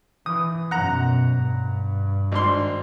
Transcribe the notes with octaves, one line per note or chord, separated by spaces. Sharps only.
E3 D#6
F#2 B2 F#5 A#5
G2
G#1 D4 C6